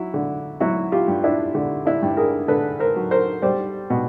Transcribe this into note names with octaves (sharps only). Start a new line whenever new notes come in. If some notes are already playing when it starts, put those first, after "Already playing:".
Already playing: F#3 E4
D3
F#3 E4 F#4
F4 G4
G2
D4 E4
D3
D4 E4
G2
G#4 A#4
D3 A4 B4
A#4 C5
F#3
A#4 C5
G3 C5 D5
B2